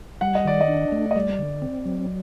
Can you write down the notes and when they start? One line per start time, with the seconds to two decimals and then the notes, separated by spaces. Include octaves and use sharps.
0.21 G3 F#5
0.35 D#5
0.45 D#3 D5
0.61 D#5
0.68 D4
0.92 A3
1.11 D#5
1.16 G3 D5
1.39 D3
1.62 C4
1.85 F#3